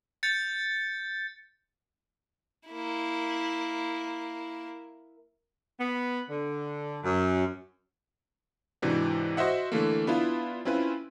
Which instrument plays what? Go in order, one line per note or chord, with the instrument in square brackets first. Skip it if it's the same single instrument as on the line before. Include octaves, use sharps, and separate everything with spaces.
[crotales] G6 A6 C#7
[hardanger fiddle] A#3 E4
[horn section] B3
D3
F#2
[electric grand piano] G#2 C3 E3 D4 F#4
F#4 C5 D#5 E5 F#5
D3 E3 A3 A#3
B3 D4 E4 F4
C4 C#4 E4 F4 B4